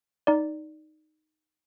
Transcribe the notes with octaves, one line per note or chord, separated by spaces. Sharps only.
D#4 D5